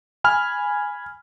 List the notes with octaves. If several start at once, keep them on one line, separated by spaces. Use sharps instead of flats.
G#5 B5 F6